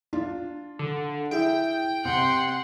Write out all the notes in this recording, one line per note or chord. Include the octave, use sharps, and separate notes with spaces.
D4 F4
D3
E4 G#4 E5 G5
C3 F#5 C6